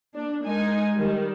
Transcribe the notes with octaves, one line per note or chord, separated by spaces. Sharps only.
A#3 D4
G#3 D#4 A#4 G#5
D#3 G3